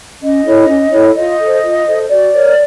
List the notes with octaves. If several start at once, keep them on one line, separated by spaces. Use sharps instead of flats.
C#4 D#5
E4 A4 C#5
C#4
E4 A4 C#5
F4 D#5
A4 C5
F4
A4 C5
F#4 D5
A#4 C#5